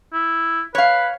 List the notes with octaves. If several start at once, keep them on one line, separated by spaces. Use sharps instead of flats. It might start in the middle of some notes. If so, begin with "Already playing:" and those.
E4
B4 C#5 F5